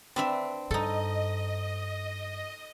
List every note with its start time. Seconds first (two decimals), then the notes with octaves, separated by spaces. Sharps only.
0.16 C4 D4 B4 E5
0.71 G2 D#4 A4 D#5